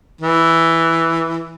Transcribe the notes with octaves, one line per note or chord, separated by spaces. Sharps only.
E3